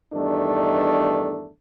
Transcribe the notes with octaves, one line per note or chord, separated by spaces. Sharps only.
E2 G2 D#3 A3 D4 D#4